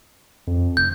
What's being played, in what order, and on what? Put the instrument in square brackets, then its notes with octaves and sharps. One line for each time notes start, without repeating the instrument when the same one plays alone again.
[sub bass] F2
[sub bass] F1 [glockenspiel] G6